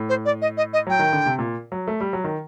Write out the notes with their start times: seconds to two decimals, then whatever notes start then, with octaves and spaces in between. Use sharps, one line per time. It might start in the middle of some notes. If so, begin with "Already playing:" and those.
Already playing: A2
0.09 C5
0.25 D5
0.42 D#5
0.57 D#5
0.73 D#5
0.87 F#3 G5
0.99 D#3
1.13 D3
1.26 C3
1.39 A#2
1.72 F#3
1.87 A3
2.01 G3
2.13 F#3
2.24 D#3